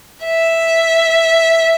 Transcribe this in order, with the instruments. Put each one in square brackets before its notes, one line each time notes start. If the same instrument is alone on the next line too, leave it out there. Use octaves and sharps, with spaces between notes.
[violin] E5